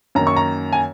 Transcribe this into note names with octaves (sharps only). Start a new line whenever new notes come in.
F#2 D#3 A#3 A#5
C#6
A#5
G#5